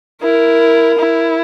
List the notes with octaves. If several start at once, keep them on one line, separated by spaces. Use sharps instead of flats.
E4 A#4
E4